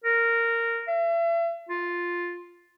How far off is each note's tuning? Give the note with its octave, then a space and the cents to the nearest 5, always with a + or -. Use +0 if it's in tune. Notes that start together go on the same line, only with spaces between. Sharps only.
A#4 -10
E5 +40
F4 +5